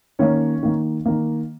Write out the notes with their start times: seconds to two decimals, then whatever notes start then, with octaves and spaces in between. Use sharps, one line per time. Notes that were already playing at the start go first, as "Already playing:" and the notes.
0.19 D#3 A#3 C#4 C#5
0.63 D#3 A#3
1.06 D#3 A#3